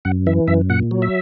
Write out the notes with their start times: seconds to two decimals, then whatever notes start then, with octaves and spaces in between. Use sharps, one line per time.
0.05 F#2 F#5
0.27 E3 E5
0.48 F#2 E5
0.69 A#2 F#5
0.91 F#3
1.02 E5